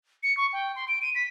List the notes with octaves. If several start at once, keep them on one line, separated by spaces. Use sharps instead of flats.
C#7
C#6
G5
C6
D7
D#7
B6